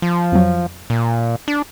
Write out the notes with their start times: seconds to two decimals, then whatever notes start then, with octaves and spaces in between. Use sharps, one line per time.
0.02 F3
0.32 F2 F#3
0.90 A#2
1.48 D4